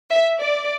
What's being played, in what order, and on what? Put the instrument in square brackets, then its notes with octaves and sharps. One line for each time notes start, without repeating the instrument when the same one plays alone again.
[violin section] E5
D5